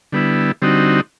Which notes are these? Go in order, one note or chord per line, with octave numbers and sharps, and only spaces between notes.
D3 G3 B3 E4
D3 G3 C4 D#4 F#4